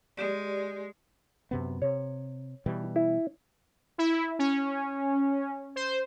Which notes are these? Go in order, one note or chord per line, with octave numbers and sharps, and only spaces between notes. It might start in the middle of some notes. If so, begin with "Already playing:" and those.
G#3 G4 D5
F#2 C3 B3
C3 C#5
B2 E3 G3
E4
E4
C#4
C5